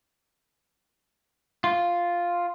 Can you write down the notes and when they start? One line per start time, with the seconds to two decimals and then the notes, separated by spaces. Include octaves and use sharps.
1.64 F4